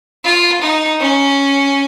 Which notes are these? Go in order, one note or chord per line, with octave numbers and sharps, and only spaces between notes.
F4
D#4
C#4